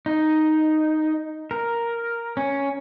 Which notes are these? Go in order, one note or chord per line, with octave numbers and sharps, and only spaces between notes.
D#4
A#4
C#4